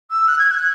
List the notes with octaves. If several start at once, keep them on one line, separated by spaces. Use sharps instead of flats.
E6
F#6
G#6
F#6